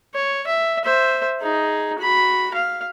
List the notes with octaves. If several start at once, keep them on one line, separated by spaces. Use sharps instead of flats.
C#5
E5
C5 E5
D#4 G#4
F#4 B5
F5